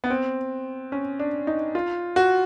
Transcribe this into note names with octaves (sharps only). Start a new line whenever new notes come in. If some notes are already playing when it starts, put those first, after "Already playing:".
B3
C4
C#4
D4
D#4
F4
F#4